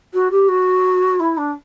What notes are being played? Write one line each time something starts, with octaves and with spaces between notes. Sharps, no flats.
F#4
G4
F#4
E4
D4